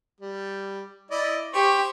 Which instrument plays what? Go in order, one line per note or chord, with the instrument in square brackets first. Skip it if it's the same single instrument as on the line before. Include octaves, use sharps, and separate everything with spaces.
[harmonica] G3
E4 D5 D#5
[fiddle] G4 [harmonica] C5 C#6